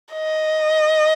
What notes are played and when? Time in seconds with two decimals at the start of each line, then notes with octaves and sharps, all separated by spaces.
0.13 D#5